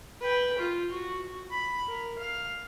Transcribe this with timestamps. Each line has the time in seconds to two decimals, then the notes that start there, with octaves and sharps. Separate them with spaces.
0.21 B4 G5
0.58 F4
0.91 F#4
1.51 B5
1.88 A#4
2.18 F5